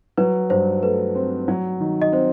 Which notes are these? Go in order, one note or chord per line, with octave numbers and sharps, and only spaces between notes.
F#3 B4
G2 C5
A3 B4
C4
F#3
D#3
D#5
C4 C5